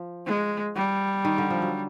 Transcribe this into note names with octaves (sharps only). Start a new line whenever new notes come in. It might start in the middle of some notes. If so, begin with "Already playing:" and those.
Already playing: F3
G#3
G3
D#3
D3
F3
F#3